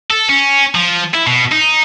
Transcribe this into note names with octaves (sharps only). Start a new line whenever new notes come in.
A4
C#4
F3
E4
B2
D#4